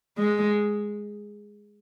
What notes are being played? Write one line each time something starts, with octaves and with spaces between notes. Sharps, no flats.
G#3